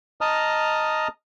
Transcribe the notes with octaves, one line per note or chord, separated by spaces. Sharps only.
D#5 A5 A#5 D#6 F6